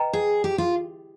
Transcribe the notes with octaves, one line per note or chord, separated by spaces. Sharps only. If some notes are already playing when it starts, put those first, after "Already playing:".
Already playing: B4 D#5 G5 A#5
G#4
G4
F4